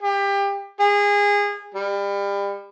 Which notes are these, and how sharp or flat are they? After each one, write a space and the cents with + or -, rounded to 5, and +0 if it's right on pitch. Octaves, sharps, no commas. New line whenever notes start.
G4 +25
G#4 -25
G3 +30